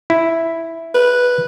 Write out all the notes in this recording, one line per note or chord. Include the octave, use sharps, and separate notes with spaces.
E4
B4